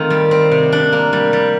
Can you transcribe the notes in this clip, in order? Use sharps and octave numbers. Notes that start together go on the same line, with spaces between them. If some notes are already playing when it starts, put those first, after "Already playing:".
Already playing: D#3 A3 C4 F4
G3
C4
C3
D4
A#3
G3
G3